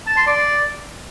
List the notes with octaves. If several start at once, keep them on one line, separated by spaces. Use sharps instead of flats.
A5
C6
D5